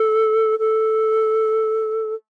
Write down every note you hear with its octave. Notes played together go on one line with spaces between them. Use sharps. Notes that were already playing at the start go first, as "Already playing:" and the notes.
Already playing: A4
A4